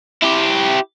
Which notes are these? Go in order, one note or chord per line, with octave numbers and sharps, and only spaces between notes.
E4 G4